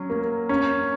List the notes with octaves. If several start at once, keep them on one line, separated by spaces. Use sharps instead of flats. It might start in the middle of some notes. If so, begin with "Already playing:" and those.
Already playing: F#3 C#4
A#3
C#4